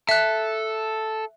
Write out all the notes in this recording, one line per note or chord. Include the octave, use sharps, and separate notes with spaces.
A4 E5 F#6